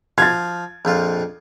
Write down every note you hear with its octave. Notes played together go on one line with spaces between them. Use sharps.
F3 F5 G#6 A6
A#1 F2 F4